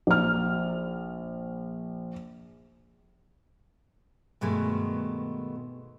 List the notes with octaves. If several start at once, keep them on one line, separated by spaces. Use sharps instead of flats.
A#1 F6
G2 B2 D#3 G#3 A3